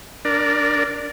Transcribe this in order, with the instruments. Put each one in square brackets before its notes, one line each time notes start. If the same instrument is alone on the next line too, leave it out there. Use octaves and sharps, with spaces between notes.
[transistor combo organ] D4 A#4 D5